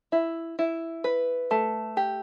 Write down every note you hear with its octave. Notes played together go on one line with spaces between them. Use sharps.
E4
E4
B4
A3
G4